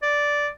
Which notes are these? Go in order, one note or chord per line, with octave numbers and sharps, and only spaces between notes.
D5